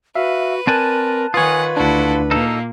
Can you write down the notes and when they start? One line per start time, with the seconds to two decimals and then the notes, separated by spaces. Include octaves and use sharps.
0.15 F#4 B4 E5 F5
0.67 C4 A#4 D5 G#5 A5 F#6
1.34 D#3 F4 B4 C#5 F#5 G#5 D#6
1.77 D2 D4 E4 F#4 A4
2.31 A#2 A#3 D#4 A4